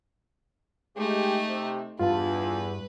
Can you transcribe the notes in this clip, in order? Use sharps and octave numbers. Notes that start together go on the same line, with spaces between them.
G#3 A3 D#4 G4
C3
E2 G2 F4 B4 A5